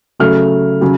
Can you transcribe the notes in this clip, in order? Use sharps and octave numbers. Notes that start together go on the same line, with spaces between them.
C#3 F#3 A3 F6
C#3 F#3